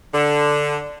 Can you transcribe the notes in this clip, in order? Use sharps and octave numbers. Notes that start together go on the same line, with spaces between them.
D3